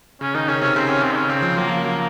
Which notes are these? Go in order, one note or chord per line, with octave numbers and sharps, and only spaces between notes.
C#3 C#4
D#3 D#4
C#3 C#4
C3 C#4
C#3 C4
C#4
C#3 C4
D#4
C#4
C#3 C4
F3
F#3 A#3
F3
F#3 A#3